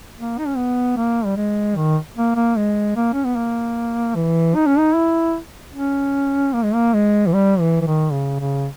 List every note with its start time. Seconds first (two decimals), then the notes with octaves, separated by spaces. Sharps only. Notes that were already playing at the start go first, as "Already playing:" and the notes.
0.18 A#3
0.38 D#4
0.47 C#4
0.57 B3
0.97 A#3
1.25 G3
1.37 G#3
1.76 D#3
2.17 A#3
2.36 A#3
2.57 G#3
2.96 A#3
3.13 C#4
3.25 B3
3.36 A#3
4.15 E3
4.55 D#4
4.67 C#4
4.79 D#4
4.95 E4
5.74 C#4
6.54 A#3
6.64 G#3
6.74 A#3
6.94 G#3
7.27 E3
7.33 G3
7.60 E3
7.81 E3
7.87 D#3
8.12 C#3
8.40 C#3